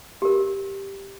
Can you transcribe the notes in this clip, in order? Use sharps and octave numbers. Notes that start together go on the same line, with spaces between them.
G4 A#4